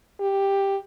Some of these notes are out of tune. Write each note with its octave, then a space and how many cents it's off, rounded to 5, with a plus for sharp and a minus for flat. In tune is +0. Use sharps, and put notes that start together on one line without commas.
G4 +5